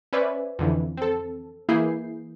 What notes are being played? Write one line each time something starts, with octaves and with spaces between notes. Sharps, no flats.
C#4 B4 C5 D5 E5 G#5
F2 D3 E3
C4 A4
E3 A#3 E4 G#4 G6 C7